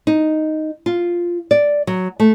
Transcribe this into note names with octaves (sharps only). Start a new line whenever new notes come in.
D#4
F4
D5
F#3
A3